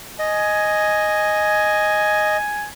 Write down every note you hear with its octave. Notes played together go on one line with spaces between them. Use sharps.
D#5 G#5